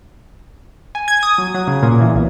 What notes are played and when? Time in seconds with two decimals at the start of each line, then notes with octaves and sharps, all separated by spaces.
0.95 G#5
1.08 G#6
1.23 D#6
1.38 F#3
1.54 F#3
1.68 C#3
1.82 A#2
2.01 E3
2.15 B1